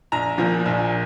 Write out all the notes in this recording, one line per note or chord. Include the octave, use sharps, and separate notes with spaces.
A#1 A#5
A#2 F3
A#1